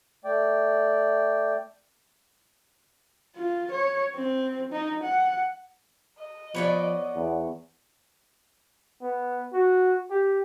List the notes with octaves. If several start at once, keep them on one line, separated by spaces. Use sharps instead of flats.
A3 D5 G5
F4
C#5
C4
D#4
F#5
D#5
F3 B3 C#5 D5
E2
B3
F#4
G4